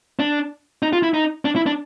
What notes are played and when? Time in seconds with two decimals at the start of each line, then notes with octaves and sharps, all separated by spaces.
0.19 D4
0.82 D#4
0.93 F4
1.03 E4
1.14 D#4
1.45 D4
1.56 E4
1.66 D4